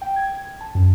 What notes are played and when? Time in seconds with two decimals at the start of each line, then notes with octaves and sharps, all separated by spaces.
0.02 G5
0.16 G#6
0.61 A5
0.75 F#2